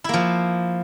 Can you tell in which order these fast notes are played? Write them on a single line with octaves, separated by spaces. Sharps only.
E4 A#3 F3